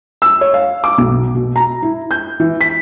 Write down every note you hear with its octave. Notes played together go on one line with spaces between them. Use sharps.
E6
C#5
F5
D6
B1
B2
A#5
E4
G6
E3
B6